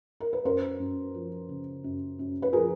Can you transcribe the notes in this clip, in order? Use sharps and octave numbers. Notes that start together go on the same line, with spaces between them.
A#4
B4
F#2 A#4 C5
F#2
F3
C#3
F#2
F#2
B4
F3 G#4 A#4